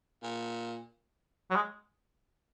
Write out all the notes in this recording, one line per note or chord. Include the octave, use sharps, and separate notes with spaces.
A#2
F#3
G#3